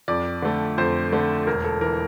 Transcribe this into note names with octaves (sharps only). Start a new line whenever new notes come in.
F2 D5
D3 A3
F2 C5
D3 A3
E1 A#4
A4
E3 A#4